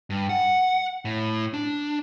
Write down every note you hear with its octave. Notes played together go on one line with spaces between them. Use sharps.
G2
F#5
A2
D4